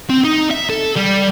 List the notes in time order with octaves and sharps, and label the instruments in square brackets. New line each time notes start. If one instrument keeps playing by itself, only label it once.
[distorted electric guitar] C4
D#4
E5
A4
G3